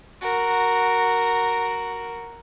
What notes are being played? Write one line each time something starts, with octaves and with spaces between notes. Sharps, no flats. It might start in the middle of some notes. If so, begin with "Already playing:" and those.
F#4 A#4